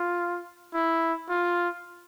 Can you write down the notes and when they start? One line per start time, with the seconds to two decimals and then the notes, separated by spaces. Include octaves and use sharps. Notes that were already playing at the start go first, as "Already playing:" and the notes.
Already playing: F4
0.74 E4
1.29 F4